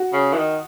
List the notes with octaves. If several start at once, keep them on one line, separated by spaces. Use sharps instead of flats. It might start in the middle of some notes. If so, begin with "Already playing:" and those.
Already playing: F#4
C#3
E3
D#3